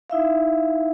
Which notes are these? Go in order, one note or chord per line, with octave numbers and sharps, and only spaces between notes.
D#4 E4 E5 F5